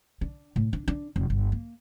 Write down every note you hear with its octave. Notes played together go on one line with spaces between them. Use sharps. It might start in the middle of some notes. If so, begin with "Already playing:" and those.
D4
A2
D4
D4
F1
G1
A#3